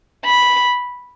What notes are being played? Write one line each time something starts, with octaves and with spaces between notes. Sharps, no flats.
B5